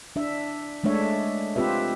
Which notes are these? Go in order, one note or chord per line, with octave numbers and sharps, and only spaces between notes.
D4 E5
G#3 A3 D4 C#5 E5
C4 F4 G4 B4 E5